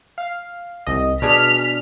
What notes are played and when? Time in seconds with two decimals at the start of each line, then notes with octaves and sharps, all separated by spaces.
0.18 F5
0.87 C2 D#5
1.22 B2 D4 G#4 F6 B6